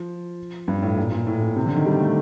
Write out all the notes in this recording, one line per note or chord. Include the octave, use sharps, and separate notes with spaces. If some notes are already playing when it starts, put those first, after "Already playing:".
Already playing: F3
G2
A2
A#2
A#2
A2
A#2
C3
D3
D#3
G3
A3